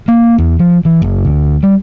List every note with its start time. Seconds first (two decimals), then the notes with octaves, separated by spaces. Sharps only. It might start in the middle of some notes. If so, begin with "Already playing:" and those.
0.08 A#3
0.38 E2
0.59 F3
0.85 E3
1.02 F#1
1.25 D2
1.63 G3